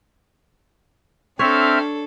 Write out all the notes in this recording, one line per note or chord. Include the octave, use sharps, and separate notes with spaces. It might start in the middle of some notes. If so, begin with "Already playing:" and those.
C4 D4 A4 C#5 E5 F6